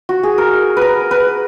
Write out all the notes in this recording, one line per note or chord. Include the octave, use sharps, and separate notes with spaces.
F#4
G#4
A#4
A#4 B4
B4